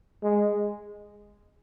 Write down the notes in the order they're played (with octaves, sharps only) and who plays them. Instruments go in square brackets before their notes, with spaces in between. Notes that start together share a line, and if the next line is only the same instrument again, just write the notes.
[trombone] G#3